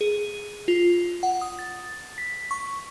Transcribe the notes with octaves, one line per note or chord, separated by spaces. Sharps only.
G#4
F4
F#5
D#6
A6
B6
C#6